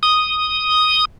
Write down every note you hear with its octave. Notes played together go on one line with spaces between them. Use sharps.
D#6